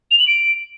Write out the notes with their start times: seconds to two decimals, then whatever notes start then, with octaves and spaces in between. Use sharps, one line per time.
0.11 F7
0.19 F#7
0.27 D7